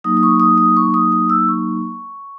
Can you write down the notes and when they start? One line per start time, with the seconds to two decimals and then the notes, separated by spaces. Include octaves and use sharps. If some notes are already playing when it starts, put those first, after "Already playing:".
0.04 F#3 A#3 D#4 D#6
0.17 D#6
0.23 C#6
0.40 D#6
0.58 D#6
0.77 C#6
0.94 D#6
1.12 D#6
1.30 E6
1.48 C#6